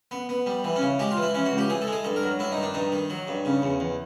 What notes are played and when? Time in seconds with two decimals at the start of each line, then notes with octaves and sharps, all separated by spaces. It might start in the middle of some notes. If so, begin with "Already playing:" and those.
0.11 B3
0.29 B3
0.46 G3
0.64 E3
0.76 C#4
0.82 C#3
0.99 G#3 G4
1.11 F4
1.17 E3
1.23 E4
1.34 E3 C#4
1.46 F#4
1.52 C#2
1.58 G4
1.69 E3 G#4
1.82 A4
1.87 G#3
1.92 G#4
2.04 G2 A4
2.16 A#4
2.22 F#3
2.39 G2 E4
2.52 D#4
2.57 D#3
2.63 D4
2.74 G2 D#4
2.92 D#3
3.10 F#3
3.28 G2
3.45 C#3
3.62 E2
3.80 E2